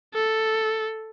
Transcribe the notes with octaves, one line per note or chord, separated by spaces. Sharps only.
A4